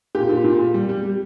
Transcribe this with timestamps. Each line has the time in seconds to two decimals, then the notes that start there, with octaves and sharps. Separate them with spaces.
0.15 A#2 G4
0.29 A#2
0.44 A#2
0.59 A#2
0.74 G3
0.89 G3
1.03 G3